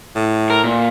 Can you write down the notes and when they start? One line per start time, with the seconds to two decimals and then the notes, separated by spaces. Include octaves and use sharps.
0.16 A2
0.50 A#4
0.64 A#2